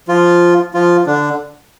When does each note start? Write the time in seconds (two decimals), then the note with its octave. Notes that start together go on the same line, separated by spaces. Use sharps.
0.08 F3 F4
0.74 F3 F4
1.07 D3 D4